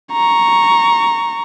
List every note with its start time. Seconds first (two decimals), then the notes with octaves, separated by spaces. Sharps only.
0.13 A#5 C#6